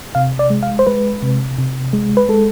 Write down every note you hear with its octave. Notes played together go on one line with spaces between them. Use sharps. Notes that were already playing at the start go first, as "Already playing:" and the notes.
C3 F5
D5
G#3
F5
C5
G#3 B4
C3
C3
G#3
B4
G#3 A4